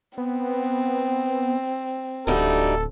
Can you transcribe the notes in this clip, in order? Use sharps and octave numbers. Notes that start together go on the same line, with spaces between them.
B3 C4
D1 D2 G3 D#4 A4